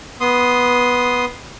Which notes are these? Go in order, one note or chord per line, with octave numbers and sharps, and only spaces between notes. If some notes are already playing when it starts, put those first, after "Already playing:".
B3 C6 D#6